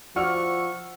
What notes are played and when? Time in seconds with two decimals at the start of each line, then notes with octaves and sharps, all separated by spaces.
0.16 F3 E4 F#4 D5 F#5 C#6 E6 F6